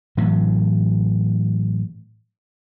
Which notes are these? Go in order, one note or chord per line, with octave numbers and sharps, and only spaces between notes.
A2 E3 F#3